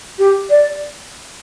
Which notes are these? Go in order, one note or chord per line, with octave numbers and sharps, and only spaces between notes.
G4
D5